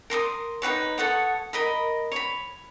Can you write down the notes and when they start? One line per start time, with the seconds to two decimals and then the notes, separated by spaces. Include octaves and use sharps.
0.10 A#4 C6 D6 D#6
0.62 D#4 G4 B4 C#5
0.98 A4 C#5 F#5 D#6
1.53 A#4 D#5 B5
2.12 C#5 B5